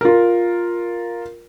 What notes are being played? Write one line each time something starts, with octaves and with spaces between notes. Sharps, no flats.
F4 A#4